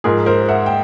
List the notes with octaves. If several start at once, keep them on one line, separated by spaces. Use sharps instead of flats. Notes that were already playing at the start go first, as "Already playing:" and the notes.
G#2 F3 G#4 A#4
A#4 C5
E5 F#5
G5